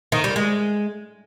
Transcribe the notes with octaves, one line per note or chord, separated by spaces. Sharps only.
D#3
G3
G#3